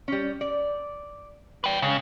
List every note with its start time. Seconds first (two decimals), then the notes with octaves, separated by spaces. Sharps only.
0.08 G3 C#4
0.41 D5
1.64 B4 G5
1.82 C#3 G#3